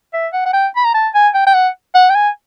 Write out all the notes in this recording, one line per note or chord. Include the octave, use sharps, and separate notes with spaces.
E5
F#5
F#5
G5
B5
A#5
A5
G#5
G5
G5
F#5
F#5
G5
G#5